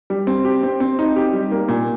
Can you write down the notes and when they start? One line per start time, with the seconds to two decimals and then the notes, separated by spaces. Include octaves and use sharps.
0.10 G3
0.27 C4
0.45 G4
0.63 C4
0.80 C4
0.99 D#4
1.16 G4
1.33 G3
1.51 A#3
1.69 A#2